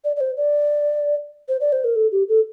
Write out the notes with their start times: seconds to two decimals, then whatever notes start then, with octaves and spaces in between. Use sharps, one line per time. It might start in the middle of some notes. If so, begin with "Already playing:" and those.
0.04 D5
0.16 D5
0.20 C5
0.37 D5
1.48 C5
1.61 D5
1.72 C5
1.84 A#4
1.96 A4
2.12 G4
2.29 A4